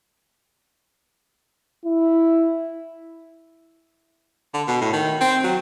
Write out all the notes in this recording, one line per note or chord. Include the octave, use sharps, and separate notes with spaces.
E4
D3
B2
A2
D#3
C4
F#3